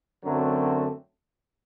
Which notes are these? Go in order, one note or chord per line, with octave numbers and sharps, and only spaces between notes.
F#2 D3 F#3 A3 C4